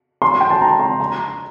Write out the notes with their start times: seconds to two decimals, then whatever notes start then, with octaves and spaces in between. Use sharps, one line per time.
0.22 C6
0.41 G5
0.50 A5
0.61 A#5
0.79 C6
1.00 A#5